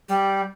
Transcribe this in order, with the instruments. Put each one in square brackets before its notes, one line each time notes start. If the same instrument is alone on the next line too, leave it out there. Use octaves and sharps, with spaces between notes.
[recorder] G3